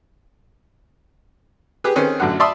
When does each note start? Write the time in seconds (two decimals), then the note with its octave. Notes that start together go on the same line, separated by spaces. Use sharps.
1.84 G4 G#4 B4
1.96 D#3 C4 C#4 G#4 B4
2.20 A1 F#2 D3 F#5
2.40 D5 E5 A5 B5 C6 D#6